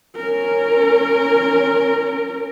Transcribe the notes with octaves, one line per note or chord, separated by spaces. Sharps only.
C#4 A#4